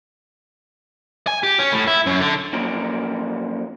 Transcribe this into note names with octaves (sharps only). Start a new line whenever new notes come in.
G#5
G4
C#4
A2
E4
F#2
D3
F#2 A#2 F3